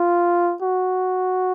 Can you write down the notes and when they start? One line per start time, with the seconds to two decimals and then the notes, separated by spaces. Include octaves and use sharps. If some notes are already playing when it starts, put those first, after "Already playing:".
Already playing: F4
0.62 F#4